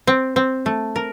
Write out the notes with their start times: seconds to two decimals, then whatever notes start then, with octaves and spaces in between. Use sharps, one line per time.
0.07 C4
0.36 C4
0.66 A3
0.96 A#4